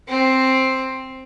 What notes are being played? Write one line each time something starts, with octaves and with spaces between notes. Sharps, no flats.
C4